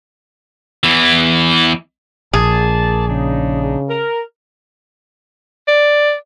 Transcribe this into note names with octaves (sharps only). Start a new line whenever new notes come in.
E2 E3
A#1 G#4 A#4 D5 A5
C#3 D4 D#4
A#4
D5